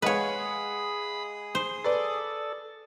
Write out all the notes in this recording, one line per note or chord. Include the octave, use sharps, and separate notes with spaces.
G#3 G#4 B4 C#5 F5 F#5 B5 D#6
C5
A4 B4 D5